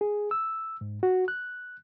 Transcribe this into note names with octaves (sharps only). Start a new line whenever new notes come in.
G#4
E6
G#2
F#4
F#6